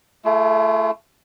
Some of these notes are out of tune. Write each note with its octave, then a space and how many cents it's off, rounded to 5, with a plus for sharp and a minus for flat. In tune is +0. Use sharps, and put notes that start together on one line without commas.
A3 +0 F4 -45 G#4 +30